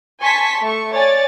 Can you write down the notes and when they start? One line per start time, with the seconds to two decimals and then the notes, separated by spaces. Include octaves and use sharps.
0.21 G#5 A5 C6 C#6 B6
0.63 A3 C#6
0.93 C#5 D5 G#5 A6